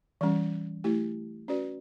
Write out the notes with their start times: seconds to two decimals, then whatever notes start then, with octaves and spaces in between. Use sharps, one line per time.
0.21 E3 G3 C#4
0.84 A3 E4 G4
1.48 C#4 F#4 B4 D5